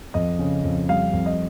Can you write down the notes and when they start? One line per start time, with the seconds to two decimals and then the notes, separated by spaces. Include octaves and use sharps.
0.14 F2 D#5
0.39 C#3
0.64 F2
0.89 G3 F5
1.13 F2
1.26 D#5